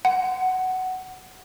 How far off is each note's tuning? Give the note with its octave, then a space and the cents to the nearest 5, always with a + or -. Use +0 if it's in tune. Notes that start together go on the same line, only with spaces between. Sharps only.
F#5 +10